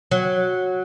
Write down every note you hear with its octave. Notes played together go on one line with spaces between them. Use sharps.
F#3